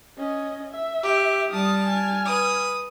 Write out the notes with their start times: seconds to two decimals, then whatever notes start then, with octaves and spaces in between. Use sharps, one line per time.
0.18 C#4 D#5
0.70 E5
1.03 G4
1.50 G3 A5 D#6 F6
1.87 G#5 F6
2.25 B4 D#6